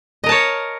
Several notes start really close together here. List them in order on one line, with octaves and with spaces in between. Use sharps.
D#5 A#4 A5 C#5